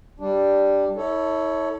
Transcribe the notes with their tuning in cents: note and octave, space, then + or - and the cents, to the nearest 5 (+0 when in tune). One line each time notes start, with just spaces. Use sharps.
G3 +0 D4 +0
E4 -40 A4 +0 C#5 +10